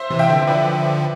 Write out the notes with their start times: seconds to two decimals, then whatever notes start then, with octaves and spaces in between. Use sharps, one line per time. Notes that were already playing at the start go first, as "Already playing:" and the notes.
Already playing: C5 E5
0.10 C3 E3
0.19 E5 G5
0.28 D3 F3
0.47 D3 F3 B4 D5